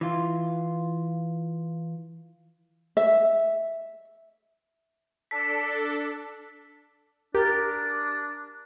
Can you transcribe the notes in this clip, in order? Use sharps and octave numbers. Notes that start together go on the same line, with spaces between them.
E3 F4
E5
D4 A4 B6
D4 G4 A#4 D6 A6